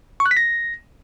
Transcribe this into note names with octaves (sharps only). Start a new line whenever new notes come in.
C#6
F#6
B6
A#6